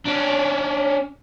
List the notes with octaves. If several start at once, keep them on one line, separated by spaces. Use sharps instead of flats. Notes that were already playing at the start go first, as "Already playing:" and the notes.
C#4 D4